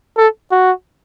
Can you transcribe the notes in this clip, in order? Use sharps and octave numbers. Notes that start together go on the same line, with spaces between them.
A4
F#4